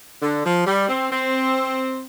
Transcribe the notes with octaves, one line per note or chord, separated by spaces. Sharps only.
D3
F3
G3
C4
C4